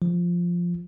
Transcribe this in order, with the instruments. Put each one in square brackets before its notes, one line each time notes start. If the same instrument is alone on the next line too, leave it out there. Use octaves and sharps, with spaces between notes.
[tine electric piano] F3